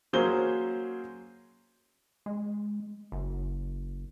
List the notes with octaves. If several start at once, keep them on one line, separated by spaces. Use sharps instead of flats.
F#3 A#3 C#4 G#4 C5 G7
G#3
F#1